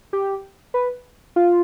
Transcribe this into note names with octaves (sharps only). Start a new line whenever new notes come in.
G4
B4
F4